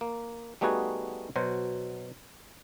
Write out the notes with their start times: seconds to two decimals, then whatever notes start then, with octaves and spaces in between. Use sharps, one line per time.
0.01 A#3
0.61 G3 A3 B3 D#4 F#4 G#4
1.36 B2 F#3 C5